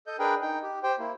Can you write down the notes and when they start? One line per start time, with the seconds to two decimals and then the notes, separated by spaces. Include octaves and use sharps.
0.07 A4 D#5 G6
0.19 D4 G#4 A#4 B4 G5
0.42 D#4 G5
0.63 G4
0.83 G4 C5 G5
0.99 A#3 E4